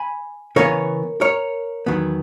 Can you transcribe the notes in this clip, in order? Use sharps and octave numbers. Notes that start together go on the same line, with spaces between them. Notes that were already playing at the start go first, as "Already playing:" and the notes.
Already playing: G#5 B5
C#3 E3 B3 A#4 C#5
A#4 C#5
E2 D#3 F#3 B3